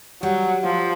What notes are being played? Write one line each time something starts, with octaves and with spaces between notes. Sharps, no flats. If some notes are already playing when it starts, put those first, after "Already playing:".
F#3 G3
F3